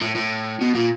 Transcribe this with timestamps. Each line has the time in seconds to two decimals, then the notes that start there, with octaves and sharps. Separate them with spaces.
0.02 A2
0.16 A2
0.61 B2
0.75 A#2